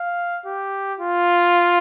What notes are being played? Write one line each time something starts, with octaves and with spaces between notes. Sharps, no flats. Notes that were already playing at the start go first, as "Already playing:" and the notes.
Already playing: F5
G4
F4